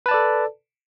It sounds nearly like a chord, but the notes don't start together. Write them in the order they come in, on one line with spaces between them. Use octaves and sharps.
B4 A5 D5 A4